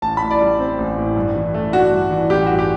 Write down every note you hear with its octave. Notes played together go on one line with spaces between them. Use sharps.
A1 A5
A2 B5
D5
G3
C4
A1
A2
G2
E3
A3
D4 F#4
G2
E3
A1 G4
G2 F#4
G4